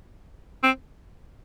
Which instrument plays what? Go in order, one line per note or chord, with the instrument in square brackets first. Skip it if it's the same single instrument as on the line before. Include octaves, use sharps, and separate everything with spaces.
[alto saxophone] C4